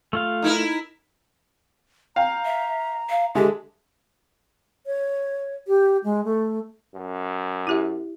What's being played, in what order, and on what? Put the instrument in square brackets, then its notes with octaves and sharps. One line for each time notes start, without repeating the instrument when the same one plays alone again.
[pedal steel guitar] A3 F4 F5
[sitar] D#4 E4 A#4
[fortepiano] F5 G5 [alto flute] A#5
[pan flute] E5
F5
[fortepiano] D3 G#3 E5 [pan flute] G4
[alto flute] C#5
G4
G#3
A3
[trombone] F#2
[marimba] E4 G4 E5